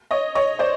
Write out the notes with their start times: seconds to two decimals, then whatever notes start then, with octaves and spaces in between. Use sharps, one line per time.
0.11 C#5 D#5
0.35 C#5 D#5
0.59 C5 D5